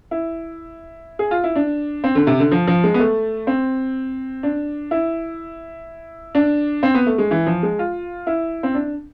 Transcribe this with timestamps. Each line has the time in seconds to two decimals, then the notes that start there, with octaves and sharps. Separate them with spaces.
0.11 E4
1.19 G#4
1.31 F4
1.44 E4
1.56 D4
2.04 C4
2.15 D3
2.27 C3
2.39 D3
2.51 F3
2.67 F3
2.84 G#3
2.94 B3
2.99 A3
3.47 C4
4.43 D4
4.91 E4
6.35 D4
6.83 C4
6.95 B3
7.06 A3
7.18 G#3
7.31 E3
7.46 F3
7.63 G#3
7.79 F4
8.27 E4
8.63 C4
8.74 D4